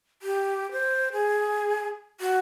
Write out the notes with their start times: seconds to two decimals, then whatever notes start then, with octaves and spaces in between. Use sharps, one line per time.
0.22 G4
0.72 C5
1.13 G#4
2.20 F#4